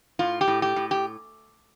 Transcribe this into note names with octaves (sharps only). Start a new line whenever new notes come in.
A2 F4
G4
A2
G4
A2
G4